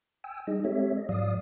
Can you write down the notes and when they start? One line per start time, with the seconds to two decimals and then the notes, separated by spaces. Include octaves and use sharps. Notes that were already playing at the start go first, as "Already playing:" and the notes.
0.24 G5 G#5 E6
0.47 G3 D#4 G#4 D#5
0.64 G#3 C4 G4 A4 C#5 E5
0.97 D#5
1.09 G#2 F3 F#3 D5 F5 D#6